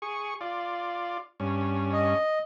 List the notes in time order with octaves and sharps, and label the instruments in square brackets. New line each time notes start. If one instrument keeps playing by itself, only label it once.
[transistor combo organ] G#4 C#6
F4 D5
G2 C#4
[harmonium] D#5